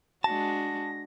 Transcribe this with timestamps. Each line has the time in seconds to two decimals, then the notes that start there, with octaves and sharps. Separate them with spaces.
0.24 G#3 D4 F#4 A5 A#6